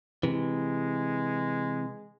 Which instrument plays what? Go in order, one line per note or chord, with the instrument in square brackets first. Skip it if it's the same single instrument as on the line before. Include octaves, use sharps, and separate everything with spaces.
[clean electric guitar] C3 E3 [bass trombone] G#3